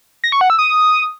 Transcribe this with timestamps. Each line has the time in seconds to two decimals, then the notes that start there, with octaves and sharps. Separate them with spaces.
0.24 A#6
0.32 C#6
0.41 F#5
0.50 E6
0.59 D#6